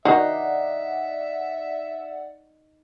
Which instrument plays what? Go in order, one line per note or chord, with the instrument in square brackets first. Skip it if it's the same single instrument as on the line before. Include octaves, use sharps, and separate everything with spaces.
[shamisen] D#3 F#4 [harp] D#4 C7 [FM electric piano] D5 F#5 [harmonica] E5